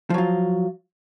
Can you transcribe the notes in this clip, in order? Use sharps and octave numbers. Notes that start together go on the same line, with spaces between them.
F3 F#3 F4